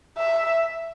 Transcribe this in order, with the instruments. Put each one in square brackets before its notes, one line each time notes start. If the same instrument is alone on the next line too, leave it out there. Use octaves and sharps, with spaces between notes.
[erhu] E5